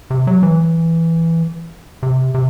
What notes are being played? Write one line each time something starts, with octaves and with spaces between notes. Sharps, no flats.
C3
F#3
E3
C3
C3